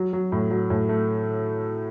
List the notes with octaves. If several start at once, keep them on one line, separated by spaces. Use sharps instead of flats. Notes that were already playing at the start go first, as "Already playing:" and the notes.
Already playing: F#3
F#3
A2
F#3
A2
A3